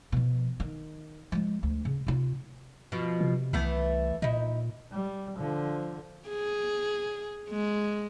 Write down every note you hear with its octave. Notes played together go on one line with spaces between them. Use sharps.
B2 F3
D#3
F3 G#3
D2
C#3
C3 F4
B2 F3
C3
C2 E3 A3 B3
A#2 D#4 E4
G3
D3 F3
G#4
G#3